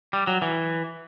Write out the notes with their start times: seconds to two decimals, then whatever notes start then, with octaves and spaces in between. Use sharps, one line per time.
0.13 G3
0.27 F#3
0.42 E3